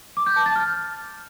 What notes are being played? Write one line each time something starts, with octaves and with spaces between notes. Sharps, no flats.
D6
G6
A5
A6
F6